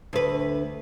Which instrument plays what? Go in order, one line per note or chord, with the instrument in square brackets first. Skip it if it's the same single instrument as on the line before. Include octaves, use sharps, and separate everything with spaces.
[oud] D2 B4